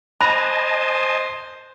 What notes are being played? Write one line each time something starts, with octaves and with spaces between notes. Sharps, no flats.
C5 D#5 G#5 A5 B5 F#6 A#6